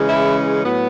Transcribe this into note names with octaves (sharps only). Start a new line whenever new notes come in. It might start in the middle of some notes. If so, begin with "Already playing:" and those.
Already playing: C#3 E3 G#3 C#4
E4
A2 F#3 B3